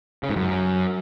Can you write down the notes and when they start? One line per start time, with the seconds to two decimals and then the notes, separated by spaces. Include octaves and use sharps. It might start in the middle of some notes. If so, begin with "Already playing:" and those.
0.23 C#3
0.30 G#2
0.36 F#2